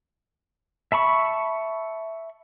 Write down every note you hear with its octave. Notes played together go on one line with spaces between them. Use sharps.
E5 A5 B5 C#6